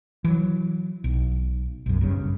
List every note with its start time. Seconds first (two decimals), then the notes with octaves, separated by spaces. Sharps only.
0.24 E3 F#3
1.04 B1
1.86 B1 F#2
2.01 F#1 G2 C#3